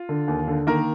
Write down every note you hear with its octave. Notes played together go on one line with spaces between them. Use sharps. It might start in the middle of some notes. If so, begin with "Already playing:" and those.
Already playing: F4
D3
D#2
D3
D#3 A#3 A#4